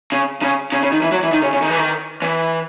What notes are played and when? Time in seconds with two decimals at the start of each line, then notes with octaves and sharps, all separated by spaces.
0.12 C#3
0.42 C#3
0.72 C#3
0.83 C#3
0.92 D#3
1.02 E3
1.12 F#3
1.23 E3
1.32 D#3
1.42 C#3
1.53 C#3
1.62 D#3
1.70 E3
1.78 D#3
2.22 E3